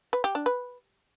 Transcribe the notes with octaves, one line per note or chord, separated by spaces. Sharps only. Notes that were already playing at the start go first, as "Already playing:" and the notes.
B4
G4
D4
B4